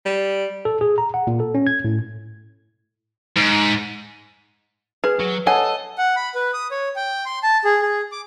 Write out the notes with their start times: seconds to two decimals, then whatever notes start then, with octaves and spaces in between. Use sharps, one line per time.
0.06 G3
0.65 A4
0.81 G#4
0.98 A#5
1.14 F#5
1.27 A#2
1.40 A4
1.55 C#4
1.67 G#6
1.85 A2
3.37 G#2
5.04 G#4 B4
5.20 F#3
5.47 A4 C#5 D#5 F#5 G#5
5.98 F#5
6.16 B5
6.35 B4
6.53 D#6
6.71 C#5
6.96 G5
7.26 C6
7.43 A5
7.65 G#4
7.82 G#4
8.12 D6